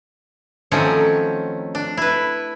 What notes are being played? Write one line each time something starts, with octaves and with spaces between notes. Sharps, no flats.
D#3 F3 F#3 A3 C4 C#4
D4
E4 B4